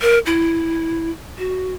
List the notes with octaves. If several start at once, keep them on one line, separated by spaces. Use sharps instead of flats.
A#4
E4
F#4